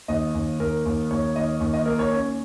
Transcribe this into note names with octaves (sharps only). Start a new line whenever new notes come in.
D#2 D#5
D#2
D#2 A#4
D#2
D#2 C#5
D#2 D#5
D#2
D#5
A#3 A#4
C#5
C#4